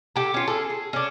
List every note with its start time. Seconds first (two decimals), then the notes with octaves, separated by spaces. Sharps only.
0.16 G4 A4
0.34 C#4 F4
0.47 G#4 A4
0.70 G#4
0.93 C#4 D4